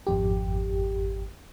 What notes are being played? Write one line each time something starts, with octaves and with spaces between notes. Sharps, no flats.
G#1 F2 G4